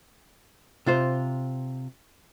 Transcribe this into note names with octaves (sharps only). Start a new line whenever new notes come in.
C3 F4 C5